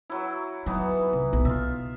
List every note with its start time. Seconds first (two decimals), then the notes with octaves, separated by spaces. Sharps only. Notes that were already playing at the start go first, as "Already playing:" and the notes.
0.10 F#3 E4
0.66 E3 F#3 B3 D#4
1.13 C2
1.33 B1
1.45 B2 F4 E5